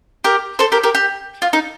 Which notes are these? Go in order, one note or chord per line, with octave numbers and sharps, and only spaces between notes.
G4 A#4
A4 C5
G4 A#4
G4 A#4
G4
F4
D#4